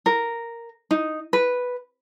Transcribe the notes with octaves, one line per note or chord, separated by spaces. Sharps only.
A#4
D#4
B4